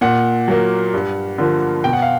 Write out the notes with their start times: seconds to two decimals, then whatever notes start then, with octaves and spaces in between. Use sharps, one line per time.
0.01 A#2 F#5
0.48 F#3 A#3
0.94 G2
1.38 D3 F3 A#3
1.84 B2 G5
1.93 F#5
2.02 F5